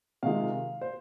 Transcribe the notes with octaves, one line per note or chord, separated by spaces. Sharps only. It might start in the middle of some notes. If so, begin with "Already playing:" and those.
C3 D#3 G#3 F4 F5
C5